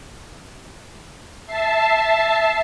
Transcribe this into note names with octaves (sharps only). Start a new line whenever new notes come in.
E5 A5 C7